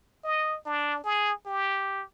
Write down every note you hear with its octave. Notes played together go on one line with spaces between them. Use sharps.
D#5
D4
G#4
G4